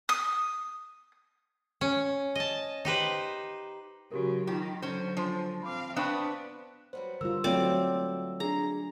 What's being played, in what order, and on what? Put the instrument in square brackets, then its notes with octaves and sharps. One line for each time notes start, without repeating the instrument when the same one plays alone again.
[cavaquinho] D#6
[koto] C#4
D#5 A5
D#4 G4 B4 C5
[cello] C#3 F#3 [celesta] F#4 G4 A#4
[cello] D#3 [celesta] D#4 F4 [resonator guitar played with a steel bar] G4
[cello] D3 F#3 [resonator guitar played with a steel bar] C#4 C5
[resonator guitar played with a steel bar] F3 [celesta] D4 C5 C6
[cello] C4 F5 [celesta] B5 D6
[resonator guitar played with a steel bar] B3 C4 D4 [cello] B4 [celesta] F5 B5 C#6
[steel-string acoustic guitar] F#3 G3 B3 [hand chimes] C5
[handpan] D3 G3 F4 [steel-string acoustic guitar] A#4 [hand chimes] E6
[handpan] F#3 A3 F4 [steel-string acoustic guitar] B3 C#5 G5 [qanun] C4 D5
[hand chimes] D4 G#4 [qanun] A#5